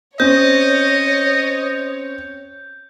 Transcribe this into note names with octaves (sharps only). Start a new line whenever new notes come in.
C4 C#4 C#5 D#5 G6